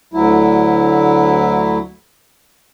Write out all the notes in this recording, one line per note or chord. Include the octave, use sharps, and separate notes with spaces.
D2 F#3 E4